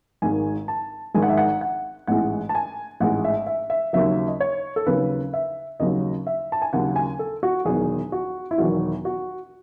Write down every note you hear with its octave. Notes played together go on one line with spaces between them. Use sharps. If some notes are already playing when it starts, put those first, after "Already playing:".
G#1 G#2 D#3 G#3 G#5
A5
G#1 G#2 D#3 G#3 G#5
F#5
E5
F#5
F#5
A1 G#2 E3 G#3 F#5
A5
G#5
A1 G#2 E3 G#3 F#5
E5
E5
E5
D#2 C#3 F#3 E5
D#5
C#5
A4
D#2 C#3 F#3 B4
E5
D#2 C#3 F#3 D#5
E5
A5
G#5
D#2 C#3 F#3 F#5
G#5
A4
F#4
E1 E2 D#3 F#3 G#4
F#4
E4
E1 E2 D#3 F#3 F#4
F#4